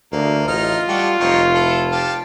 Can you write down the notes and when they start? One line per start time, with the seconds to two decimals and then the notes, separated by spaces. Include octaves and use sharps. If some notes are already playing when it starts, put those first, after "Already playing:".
0.12 D2 A#3
0.48 A1 D#4 F4 F6
0.88 G3 F#4 G4 A4
1.20 F1 C4 D#4 C#5
1.54 E4 A4
1.92 G4 F5 A5